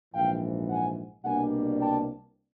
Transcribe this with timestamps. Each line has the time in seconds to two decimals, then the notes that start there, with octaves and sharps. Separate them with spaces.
0.14 A#1 G#2 E3 F5 G5
0.69 F#5 G#5
1.24 C2 B2 G3 A#3 D4 F#5 G#5
1.80 G5 A5